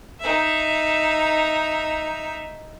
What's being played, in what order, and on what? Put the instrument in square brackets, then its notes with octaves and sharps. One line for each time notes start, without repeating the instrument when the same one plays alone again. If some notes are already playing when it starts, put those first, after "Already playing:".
[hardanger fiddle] D#4 E5